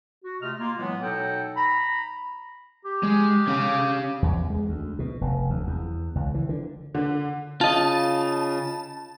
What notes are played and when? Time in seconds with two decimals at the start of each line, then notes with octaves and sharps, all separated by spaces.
0.25 F#4
0.42 C3 A3 F4 D#5 F6
0.59 A#3 F4
0.77 A2 E3 F#3 G#3 B3
1.03 B2 F#3 D#4 A4 F#5 G5
1.56 A#5 B5
2.85 G4
3.03 G#3
3.48 C#4 F5
4.22 E2
4.50 G#3
4.69 D2
4.99 B2
5.21 F1
5.50 D2
5.67 E2
6.15 C#2
6.34 E3
6.49 D3
6.95 D3
7.61 C#3 F4 D#5 A5